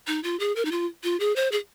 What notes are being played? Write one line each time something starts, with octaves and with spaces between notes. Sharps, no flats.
D#4
F4
G#4
A#4
D#4
F4
F4
G#4
C5
G#4